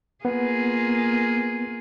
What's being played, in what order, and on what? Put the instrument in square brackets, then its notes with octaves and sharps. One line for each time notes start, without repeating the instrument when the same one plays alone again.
[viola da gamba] A#3 F4 G#4 [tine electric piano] B3